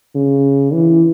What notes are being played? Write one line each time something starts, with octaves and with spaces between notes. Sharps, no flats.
C#3
E3